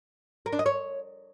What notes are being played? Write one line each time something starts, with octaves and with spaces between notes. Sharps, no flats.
A#4
D4
D#5
C#5